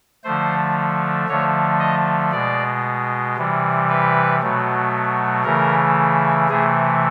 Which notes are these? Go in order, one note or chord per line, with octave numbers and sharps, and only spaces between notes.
D3 F3 A3 C5
D3 F3 A3 C#5
D#5
B2 G#3 D5
C3 E3 G3
B4
B2 F#3 A3
C#3 E3 A3 A#4
C3 E3 A3 G#4